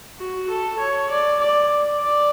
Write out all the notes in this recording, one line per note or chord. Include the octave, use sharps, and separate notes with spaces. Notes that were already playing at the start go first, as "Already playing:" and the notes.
F#4
A4
C#5
D5
D5
D5